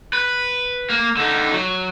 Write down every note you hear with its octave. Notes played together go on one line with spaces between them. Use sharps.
B4
A#3
D3 D#4
F#3